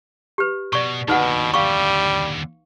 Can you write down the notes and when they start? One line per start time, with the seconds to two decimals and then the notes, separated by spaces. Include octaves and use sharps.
0.38 G4 B4
0.73 B2 D5 C#6
1.08 D#2 B2 D3 D#4 B4 F#5
1.54 G3 F5 C#6